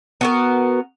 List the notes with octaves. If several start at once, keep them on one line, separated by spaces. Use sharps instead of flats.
B3 F#4 A#4